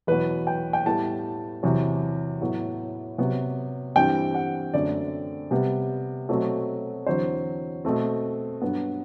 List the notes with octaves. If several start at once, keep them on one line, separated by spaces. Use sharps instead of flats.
E2 B2 F#3 B3 B4
G5
G5
A2 G3 B3 A5
E2 C3 F#3
A2 F#3 B3
C3 F#3 B3
G2 E3 G3 C4 G5
F#5
F#2 D3 A3 C4 D5
C3 G3 B3
B2 F#3 A3 C4
E2 D3 F#3 C4 C5
B2 A3 C4
G2 F#3 B3